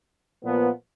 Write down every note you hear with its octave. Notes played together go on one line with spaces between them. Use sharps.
A#2 F3 B3